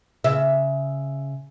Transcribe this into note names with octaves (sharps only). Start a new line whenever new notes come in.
C#3 E5